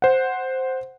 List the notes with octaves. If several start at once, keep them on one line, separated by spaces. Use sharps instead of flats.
C5 F#5